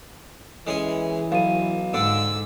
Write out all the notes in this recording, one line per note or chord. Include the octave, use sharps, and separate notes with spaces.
E3 G#3 C#4 G#4
B1 F5 D#7
G#2 D3 D4 E6